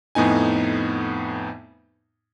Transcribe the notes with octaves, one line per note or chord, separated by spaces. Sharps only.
F2 A2 B3 D#4 G#5